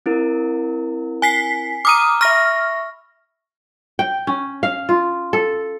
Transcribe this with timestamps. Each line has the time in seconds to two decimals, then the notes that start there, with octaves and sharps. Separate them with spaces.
0.06 C4 E4 A#4
1.22 G#5 B6 C7
1.85 A#5 D6 D#6 F6 D#7
2.21 E5 B5 C#6 F6 A#6
3.99 G5
4.27 C#4
4.63 F5
4.89 F4
5.33 A4